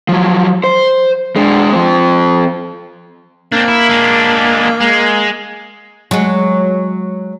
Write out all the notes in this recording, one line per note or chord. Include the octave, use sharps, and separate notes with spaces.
F3 F#3
C5
G#3 D4
F3 C4
A#3 C4 D4
E4
G#3 D4
G#3
F#3 G#3